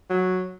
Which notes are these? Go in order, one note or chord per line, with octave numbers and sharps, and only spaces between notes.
F#3